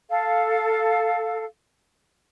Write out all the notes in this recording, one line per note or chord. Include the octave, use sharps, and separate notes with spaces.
A4 F5